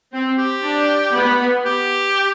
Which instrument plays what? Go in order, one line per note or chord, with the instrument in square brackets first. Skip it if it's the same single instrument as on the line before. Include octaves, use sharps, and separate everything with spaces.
[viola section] C4
[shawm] G4
[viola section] D4
B3
[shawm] G4